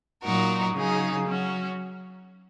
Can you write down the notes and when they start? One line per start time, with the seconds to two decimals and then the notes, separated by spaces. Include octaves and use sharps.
0.22 A#2 F#3 D#4 F#4 A#4
0.73 C#3 F#3 D#4 G#4
1.25 F#3 C#4 F#4